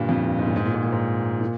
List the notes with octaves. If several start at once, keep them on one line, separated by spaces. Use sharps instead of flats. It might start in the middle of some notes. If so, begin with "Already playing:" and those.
Already playing: G2 A#2 D3
F2
G2
G#2
A#2
G#2
A#2
G#2
A#2
G#2
A#2